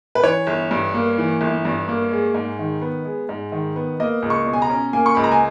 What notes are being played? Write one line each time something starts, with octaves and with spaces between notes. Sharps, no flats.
B4
E3 C#5
G1
G2
A#3
E3
G1
G2
A#3
G#3
G#2
D#3
B3
G#3
G#2
D#3
B3
A#3 D#5
C#2
C#6
B2
G#5
A#5
C#4
A#3 G#5
C#6
C#2 B5
A#5
G#5